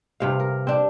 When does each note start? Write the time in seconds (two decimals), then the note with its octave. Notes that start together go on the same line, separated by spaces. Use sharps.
0.20 G2 C3 F5
0.40 A#4
0.67 C4 D4